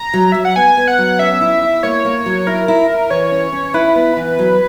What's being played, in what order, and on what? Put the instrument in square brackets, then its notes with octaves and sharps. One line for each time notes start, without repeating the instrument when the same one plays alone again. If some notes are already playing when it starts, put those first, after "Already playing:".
Already playing: [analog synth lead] A#5
[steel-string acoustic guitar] F#3
[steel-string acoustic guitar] F#3 [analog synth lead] E5
[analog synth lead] F#5
[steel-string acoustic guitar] B3 [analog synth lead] G#5
[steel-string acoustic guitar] B3
[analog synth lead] F#5
[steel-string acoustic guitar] F#3
[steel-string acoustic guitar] C#4 [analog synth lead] E5
[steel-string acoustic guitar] E4
E4
[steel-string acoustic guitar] A#3 [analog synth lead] C#5
[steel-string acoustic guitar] A#3
F#3
[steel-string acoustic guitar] E4 [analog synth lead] A#4
[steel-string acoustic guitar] E4
E4
[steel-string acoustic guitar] E3 [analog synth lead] C#5
[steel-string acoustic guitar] C#4
C#4
[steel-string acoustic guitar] E4 [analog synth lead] B4
[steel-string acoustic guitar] B3
E3
F#3